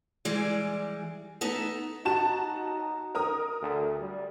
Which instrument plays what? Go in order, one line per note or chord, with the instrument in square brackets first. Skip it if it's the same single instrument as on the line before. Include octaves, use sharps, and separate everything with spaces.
[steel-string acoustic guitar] E3 G3 G#3 D5
A3 B3 D#4 A5
[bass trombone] D#4 [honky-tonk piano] F#4 A5 E7
[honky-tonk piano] A#4 A#5 D#6
[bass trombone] D2
G3